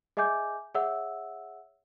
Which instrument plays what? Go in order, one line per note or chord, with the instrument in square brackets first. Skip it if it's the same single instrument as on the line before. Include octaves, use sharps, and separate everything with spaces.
[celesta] G#4 D#5 E5 G#5 D6 G6
G#4 C#5 E5 F#5 E6